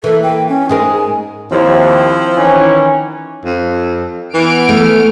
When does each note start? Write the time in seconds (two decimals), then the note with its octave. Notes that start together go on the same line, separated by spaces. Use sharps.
0.04 E3 A#3 A4
0.23 G5
0.49 C#4
0.69 G#2 G#3 A#4 G#5
1.51 D#2 F3 C4 E4
2.36 D#3 E3 C#4
3.44 F2
4.34 E3 B3 F6 D7
4.69 A3